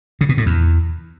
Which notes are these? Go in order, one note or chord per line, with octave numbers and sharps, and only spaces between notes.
C#3
B2
A2
E2